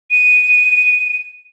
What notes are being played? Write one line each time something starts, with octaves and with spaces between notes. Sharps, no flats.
D#7